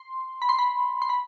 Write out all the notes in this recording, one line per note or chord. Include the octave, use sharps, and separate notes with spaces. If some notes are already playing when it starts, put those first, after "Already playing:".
Already playing: C6
B5
C6
B5
C6
B5